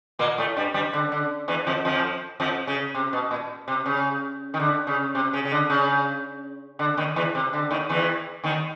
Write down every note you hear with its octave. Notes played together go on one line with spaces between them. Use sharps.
A#2 A#3
A2 A3
G2 G3
G2 G3
D3
D3
E2 E3
F2 F3
F2 F3
F2 F3
C#3
C3
B2
A#2
C3
C#3
D#3
D3
C#3
C3
C#3
C#3
D3
C#3
D3
D#2 D#3
E2 E3
C3
D3
D#2 D#3
E2 E3
D#2 D#3